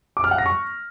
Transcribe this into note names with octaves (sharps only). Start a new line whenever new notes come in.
D6
F6
F#5
A#6
C#6